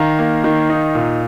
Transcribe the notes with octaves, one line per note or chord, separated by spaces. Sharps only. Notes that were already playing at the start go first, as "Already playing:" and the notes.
Already playing: D#3 F5 A#5
A#3
D#3
D#4
A#2